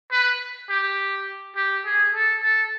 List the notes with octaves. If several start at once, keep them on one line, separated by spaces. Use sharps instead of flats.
B4
G4
G4
G#4
A4
A4